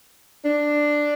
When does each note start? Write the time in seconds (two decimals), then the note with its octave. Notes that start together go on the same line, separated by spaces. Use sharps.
0.45 D4